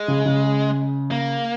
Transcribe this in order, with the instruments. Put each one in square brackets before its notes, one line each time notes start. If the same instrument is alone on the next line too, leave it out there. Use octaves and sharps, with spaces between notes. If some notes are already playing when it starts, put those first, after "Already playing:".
Already playing: [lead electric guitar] G#3
[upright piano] C#3
C#3
[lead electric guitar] A#3